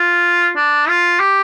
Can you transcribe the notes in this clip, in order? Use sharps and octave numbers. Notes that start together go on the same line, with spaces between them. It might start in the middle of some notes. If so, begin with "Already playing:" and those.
Already playing: F4
D4
F4
G4